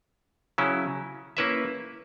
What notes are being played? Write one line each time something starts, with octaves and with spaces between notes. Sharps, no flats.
C#3 F#3 C#4 E4
A#3 C#4 E4 B4 E5